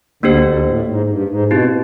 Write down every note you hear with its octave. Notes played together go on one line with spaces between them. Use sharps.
D2 D3 A#3 D4 G4 C5
D2 D3
A2
G#2
G2
G#2
B2 C4 E4 G4